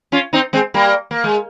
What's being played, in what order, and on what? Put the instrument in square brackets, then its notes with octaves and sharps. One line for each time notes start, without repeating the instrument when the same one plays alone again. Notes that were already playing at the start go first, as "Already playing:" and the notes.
[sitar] C#4 F4
C4 D#4
G#3 C4
G3 A#3
A#3
G#3